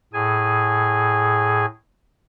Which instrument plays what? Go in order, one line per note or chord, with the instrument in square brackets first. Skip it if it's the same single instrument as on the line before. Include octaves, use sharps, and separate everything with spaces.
[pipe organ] A2 G#4 G#5